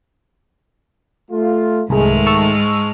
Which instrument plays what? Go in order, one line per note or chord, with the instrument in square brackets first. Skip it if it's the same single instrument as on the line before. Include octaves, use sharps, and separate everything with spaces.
[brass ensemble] A3 F4
[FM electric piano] C2 G#4 [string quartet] G#2 G#3 F6 [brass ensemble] D#3 A3
[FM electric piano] A5 C#6 E6